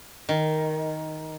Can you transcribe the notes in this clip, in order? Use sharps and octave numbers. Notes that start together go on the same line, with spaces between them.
D#3